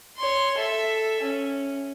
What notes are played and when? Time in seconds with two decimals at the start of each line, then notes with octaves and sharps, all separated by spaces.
0.17 C#5 C6
0.57 A4 E5
1.22 C#4